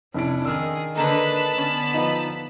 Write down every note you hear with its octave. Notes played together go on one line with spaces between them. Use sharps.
F1 C#4 D4 E4 D7
D#3 G#4 E6 F6
D3 A#3 D#4 A4 B4 A5 B5
D3 B3 C#4
F3 D#4 B4 D#5